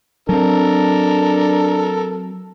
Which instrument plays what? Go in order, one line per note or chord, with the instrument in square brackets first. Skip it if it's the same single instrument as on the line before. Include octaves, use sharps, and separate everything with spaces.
[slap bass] F#3 C4 [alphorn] D4 [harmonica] A4 A#4